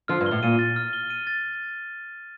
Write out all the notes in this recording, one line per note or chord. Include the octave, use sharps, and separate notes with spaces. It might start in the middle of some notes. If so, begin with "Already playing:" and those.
D3 F3 F6
G2
G7
A2
A#2 D#7
A6
F6
G7
D#7
A6